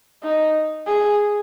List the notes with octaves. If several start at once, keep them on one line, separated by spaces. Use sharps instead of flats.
D#4
G#4